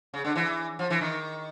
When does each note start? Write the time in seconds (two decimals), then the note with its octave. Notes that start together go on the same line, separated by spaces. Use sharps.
0.14 C#3
0.25 D3
0.36 E3
0.79 F3
0.90 E3
1.01 D#3